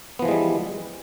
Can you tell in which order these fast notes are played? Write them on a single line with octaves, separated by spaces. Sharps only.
B3 F3 E3 G#3 G3